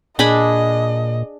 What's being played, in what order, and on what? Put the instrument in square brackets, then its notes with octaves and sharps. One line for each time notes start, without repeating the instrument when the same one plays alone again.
[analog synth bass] A#2 [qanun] D4 G#4 B5 [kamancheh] D#5